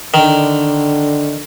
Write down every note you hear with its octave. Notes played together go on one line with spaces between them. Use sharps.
D3 D#3